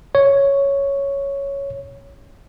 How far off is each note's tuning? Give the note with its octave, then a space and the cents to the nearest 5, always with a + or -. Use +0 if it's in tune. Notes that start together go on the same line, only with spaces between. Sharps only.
C#5 +0